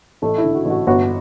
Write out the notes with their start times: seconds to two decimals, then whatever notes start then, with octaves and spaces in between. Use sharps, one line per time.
0.22 A1 A3 A4
0.38 E4
0.44 D3
0.54 F#4
0.65 A1
0.70 F#4
0.87 G1 F#4